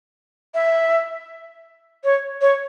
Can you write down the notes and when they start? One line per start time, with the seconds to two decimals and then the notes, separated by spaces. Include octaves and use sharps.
0.54 E5
2.04 C#5
2.41 C#5